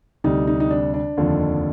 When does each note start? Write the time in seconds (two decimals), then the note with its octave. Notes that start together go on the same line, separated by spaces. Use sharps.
0.24 D2 C3 G3 D#4
0.47 D#4
0.60 D#4
0.71 D4
0.94 D4
1.17 F1 D#2 D3 F3